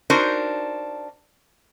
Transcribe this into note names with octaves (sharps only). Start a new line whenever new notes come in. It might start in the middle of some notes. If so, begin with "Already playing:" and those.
D4 D#4 F#4 A#4 C5